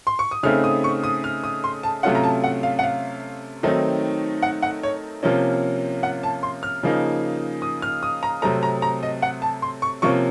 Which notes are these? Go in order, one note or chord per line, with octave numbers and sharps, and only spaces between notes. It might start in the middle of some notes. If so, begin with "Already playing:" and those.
C6
C#6
D#6
C#3 A3 C4 D#4 F6
D#6
C#6
D#6
F6
D#6
C6
A5
C3 F#3 A3 C#4 F4 F#5
A#5
A5
F#5
F5
F#5
F5
D#3 F#3 A3 C4 D#4
F#5
F#5
C#5
C3 F3 A#3 C#4
F#5
A5
C6
F6
C#3 F3 A#3 D#4
D#6
F6
D#6
A#5
C3 F#3 A3 C4 A#5
A#5
A#5
D#5
F#5
A5
C6
C#6
C3 F3 A#3 C#4 C#6